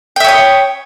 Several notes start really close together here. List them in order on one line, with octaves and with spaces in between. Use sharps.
G5 E5 C#5 D#6